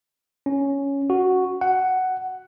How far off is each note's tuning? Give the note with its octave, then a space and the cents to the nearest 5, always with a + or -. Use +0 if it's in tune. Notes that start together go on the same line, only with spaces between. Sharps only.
C#4 +5
F#4 +0
F#5 +10